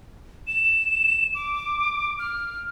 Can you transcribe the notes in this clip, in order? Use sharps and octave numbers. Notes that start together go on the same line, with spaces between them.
E7
D6
F6